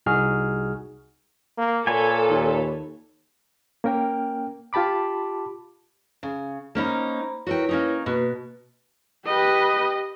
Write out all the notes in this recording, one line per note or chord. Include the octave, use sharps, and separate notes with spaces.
C2 D#4 F#4 G#4 F6
A#3
A#2 A4 B4 C#5 G#5
D#2
A#3 C#4 A#4 G5
F4 G4 A5 B5 D6
C#3
A#3 C#4 D#4 C5 A#5 B5
E4 F#4 A#4 B4 C#5 G5
A#3 C#4 D#4
B2 A#3 F#4 B4
G4 B4 D#5